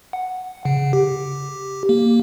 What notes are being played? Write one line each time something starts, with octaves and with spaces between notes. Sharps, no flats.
F#5
C#3
G4
A#3